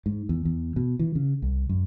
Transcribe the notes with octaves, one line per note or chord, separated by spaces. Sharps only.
G#2
E2
E2
B2
E3
C#3
C2
F#2